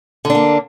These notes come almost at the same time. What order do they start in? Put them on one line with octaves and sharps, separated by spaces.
D3 D4 A#3